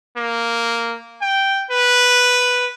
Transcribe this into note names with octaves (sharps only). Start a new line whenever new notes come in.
A#3
G5
B4